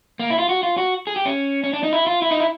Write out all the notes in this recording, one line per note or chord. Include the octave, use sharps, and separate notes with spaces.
A#3
E4
F4
F#4
F4
F#4
G#4
G4
C#4
C#4
D4
D#4
E4
F4
E4
D#4
E4